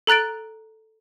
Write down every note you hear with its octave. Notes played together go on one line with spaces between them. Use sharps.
A4 A#5 F#6 A6 D7